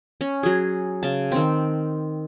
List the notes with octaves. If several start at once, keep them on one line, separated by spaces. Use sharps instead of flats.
C#4
F#3 G#4
C#3 A5
D#3 C4